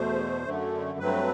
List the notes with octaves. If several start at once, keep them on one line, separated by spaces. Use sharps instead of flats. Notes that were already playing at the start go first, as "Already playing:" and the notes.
Already playing: E2 B2 A3 C5
F#2 D3 A3
G2 F#3 A3 C4 B4